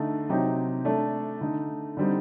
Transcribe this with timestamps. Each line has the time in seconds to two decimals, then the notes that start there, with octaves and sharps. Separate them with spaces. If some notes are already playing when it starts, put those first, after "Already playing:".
Already playing: D3 A3 D#4
0.29 C3 F#3 C4 D#4 G4
0.85 A3 D4 A4
1.41 D3 A3 D#4
1.97 D3 G3 C4 D#4